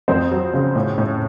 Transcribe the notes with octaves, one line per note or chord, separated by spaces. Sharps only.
F2 C4 C5
F#3
C#3
A2
A2